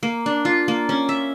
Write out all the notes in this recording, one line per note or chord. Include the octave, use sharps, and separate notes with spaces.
A#3
D4
F4
A#3
C#4
E5